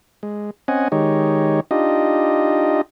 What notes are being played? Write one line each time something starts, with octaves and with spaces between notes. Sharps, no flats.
G#3
C4 C#4 D#5 F#5 G#5
D#3 G#3 D#4 G4 C#5
D4 D#4 F4 G4 D#5